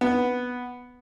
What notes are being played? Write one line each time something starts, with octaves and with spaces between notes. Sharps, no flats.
B3